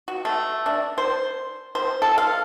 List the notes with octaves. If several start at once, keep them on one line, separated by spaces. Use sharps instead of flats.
F#4
A3
D4
C5
C5
A4
F5